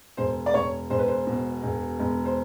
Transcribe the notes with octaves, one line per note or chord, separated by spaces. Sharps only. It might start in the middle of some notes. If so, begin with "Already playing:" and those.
E1 C5
D5
E1 C#5
E1 C5
B4
C5
B2
E1
E1
C5